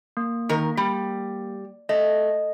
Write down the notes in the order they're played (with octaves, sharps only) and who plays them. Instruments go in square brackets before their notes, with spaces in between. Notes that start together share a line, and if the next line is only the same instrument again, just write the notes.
[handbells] A#3
[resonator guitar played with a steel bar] D#3 A#4
G3
[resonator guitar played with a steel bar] A3 [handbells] D#5